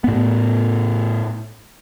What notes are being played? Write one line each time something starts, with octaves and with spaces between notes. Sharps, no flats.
A2 B3